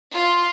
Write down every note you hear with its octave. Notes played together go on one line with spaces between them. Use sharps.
F4